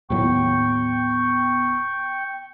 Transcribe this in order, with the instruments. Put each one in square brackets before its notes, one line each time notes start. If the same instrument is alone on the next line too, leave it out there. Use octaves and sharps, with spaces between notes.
[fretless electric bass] D#2 A2 F#3 [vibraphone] B3 [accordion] G5 C#6